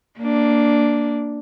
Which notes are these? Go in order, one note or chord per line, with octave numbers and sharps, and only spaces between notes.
A#3 D4